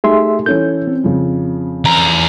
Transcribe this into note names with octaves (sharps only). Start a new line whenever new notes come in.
A3 D#4 G4 G#4 E5 C6
E3 C#4 A4 G6
C4
F2 C#3
E2 A#5